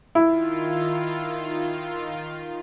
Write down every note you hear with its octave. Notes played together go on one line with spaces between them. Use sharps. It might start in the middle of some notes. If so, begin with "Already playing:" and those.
D#3 E4 F4